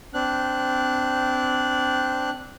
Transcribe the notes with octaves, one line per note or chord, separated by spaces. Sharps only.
C4 D4 F#6